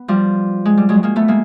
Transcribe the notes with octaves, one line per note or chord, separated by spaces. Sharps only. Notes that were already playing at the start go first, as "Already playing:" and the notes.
Already playing: B3
F3 G3
G#3
G3
F#3 G#3
G#3 A#3
A3 B3
G#3 A#3